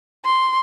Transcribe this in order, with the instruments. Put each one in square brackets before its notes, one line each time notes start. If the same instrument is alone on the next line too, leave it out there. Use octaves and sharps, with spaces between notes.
[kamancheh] C6